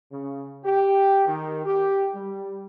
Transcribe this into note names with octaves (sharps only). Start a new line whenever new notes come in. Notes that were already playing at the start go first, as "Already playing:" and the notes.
C#3
G4
D#3
G4
G3